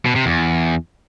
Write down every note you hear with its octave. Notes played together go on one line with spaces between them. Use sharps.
B2
C3
E2